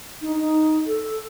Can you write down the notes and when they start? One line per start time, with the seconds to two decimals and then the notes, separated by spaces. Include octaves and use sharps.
0.21 D#4
0.37 D#4
0.86 A4